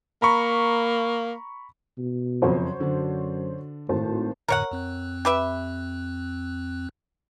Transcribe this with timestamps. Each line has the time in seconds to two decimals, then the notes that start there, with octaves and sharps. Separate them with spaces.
0.22 A#3 A#5 B5 C#6
1.98 B2
2.42 F#1 F2 F#4 C5 C#5
2.80 F#2 D3 D4
3.89 G#1 A2 C5 A5
4.48 F2 A2 D3 A#4 C#5 F#5
4.71 F2 C4 F#6
5.25 G4 B4 E5